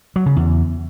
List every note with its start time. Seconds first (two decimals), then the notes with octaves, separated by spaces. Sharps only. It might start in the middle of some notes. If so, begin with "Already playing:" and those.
0.16 F#3
0.26 C#3
0.37 E2